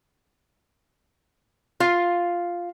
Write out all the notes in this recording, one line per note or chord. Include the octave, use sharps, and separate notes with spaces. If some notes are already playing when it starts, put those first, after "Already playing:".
F4 F5